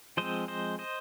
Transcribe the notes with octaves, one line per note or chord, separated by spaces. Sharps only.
F3 G#3 C4 C5 D#5
C5 D#5
C5 D#5